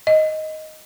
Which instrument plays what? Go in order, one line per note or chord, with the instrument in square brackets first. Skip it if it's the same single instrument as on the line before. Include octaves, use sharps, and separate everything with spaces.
[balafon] D#5